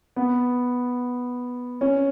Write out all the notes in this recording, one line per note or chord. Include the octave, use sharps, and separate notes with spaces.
B3
C#4